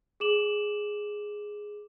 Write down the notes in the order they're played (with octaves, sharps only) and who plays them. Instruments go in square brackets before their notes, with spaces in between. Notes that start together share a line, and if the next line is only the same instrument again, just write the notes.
[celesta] G#4 D6 E7 F#7